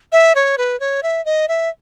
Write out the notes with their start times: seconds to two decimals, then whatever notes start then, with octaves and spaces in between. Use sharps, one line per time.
0.12 E5
0.35 C#5
0.58 B4
0.80 C#5
1.03 E5
1.25 D#5
1.48 E5